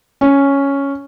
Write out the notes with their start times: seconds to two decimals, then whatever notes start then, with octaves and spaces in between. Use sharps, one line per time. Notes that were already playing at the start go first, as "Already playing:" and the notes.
0.21 C#4